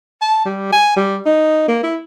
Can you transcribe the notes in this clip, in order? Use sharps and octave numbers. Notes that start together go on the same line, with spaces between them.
A5
G3
G#5
G3
D#4
A#3
E4